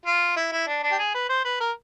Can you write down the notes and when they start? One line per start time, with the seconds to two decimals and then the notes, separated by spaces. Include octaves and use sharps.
0.06 F4
0.36 E4
0.52 E4
0.67 D4
0.83 D4
0.92 G4
0.99 G#4
1.14 B4
1.29 C5
1.45 B4
1.60 A#4